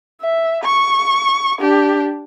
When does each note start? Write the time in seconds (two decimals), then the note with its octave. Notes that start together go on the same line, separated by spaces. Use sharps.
0.21 E5
0.64 C#6
1.61 D4 G4